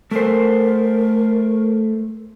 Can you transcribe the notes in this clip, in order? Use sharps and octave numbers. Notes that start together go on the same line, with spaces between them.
A3 A#4 C5